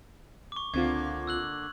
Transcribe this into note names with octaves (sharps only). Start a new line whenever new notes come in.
C#6 D6
C#2 D3 A#3 C4 F4 G#6
E6 F#6 F#7